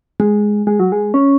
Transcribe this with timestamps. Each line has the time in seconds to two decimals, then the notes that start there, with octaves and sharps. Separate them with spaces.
0.20 G#3
0.67 G#3
0.79 F#3
0.92 G#3
1.14 C#4